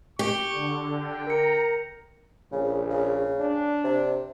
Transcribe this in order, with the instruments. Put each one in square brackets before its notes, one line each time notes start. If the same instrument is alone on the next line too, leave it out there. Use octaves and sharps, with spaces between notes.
[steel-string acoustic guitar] G4 [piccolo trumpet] C#6
[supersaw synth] D3
[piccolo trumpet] G5
[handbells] A#4 C#7 [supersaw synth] A#5
[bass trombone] A#1 [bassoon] C#3
[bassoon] C#3
[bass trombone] D4
[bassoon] C3